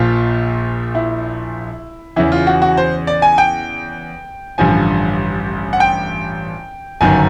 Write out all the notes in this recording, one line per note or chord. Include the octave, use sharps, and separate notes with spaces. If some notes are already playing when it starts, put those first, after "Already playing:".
Already playing: A#1 A#2 F3 F4
E4
E2 C#3 E3 E4
F4
F#4
F#4
C5
D5
G#5
G5
A1 G2 D3 F3 G#5
F#5
G5
G1 F#2 D#3 G#5